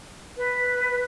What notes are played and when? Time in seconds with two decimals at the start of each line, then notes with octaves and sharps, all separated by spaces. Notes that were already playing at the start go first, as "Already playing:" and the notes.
0.37 B4